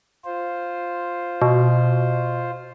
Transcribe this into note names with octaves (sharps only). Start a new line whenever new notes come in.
F4 C5
B2